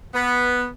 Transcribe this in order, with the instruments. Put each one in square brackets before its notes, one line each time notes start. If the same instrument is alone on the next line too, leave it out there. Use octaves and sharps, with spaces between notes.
[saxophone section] B3